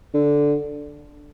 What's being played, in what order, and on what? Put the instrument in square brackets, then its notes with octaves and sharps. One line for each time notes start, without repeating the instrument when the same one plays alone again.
[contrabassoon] D3